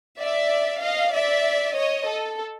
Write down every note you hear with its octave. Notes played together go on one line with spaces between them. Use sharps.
D5 E5
D#5 F5
D5 E5
C#5 D#5
A4